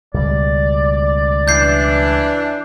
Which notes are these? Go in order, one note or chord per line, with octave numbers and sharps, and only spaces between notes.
C#2 B2 G3 D5
E3 D4 G6 C7